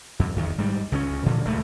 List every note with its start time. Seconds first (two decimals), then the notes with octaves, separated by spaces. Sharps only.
0.19 F2
0.36 E2 D#3
0.58 G#2 G3
0.92 C#2 C#3 C4 C#4
1.26 A#2 D3 F3
1.45 D#1 C#2 A#2 A3